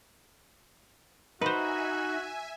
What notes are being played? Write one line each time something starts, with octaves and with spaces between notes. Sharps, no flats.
D#4 F#4 B4 C5 E5 G#5